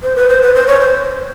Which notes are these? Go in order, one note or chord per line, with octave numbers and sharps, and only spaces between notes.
C5
B4
C5
B4
C5
C#5
C5